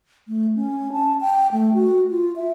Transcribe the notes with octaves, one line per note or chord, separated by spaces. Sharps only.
A3
C#4
A5
G5
A3
F#4
F4
E5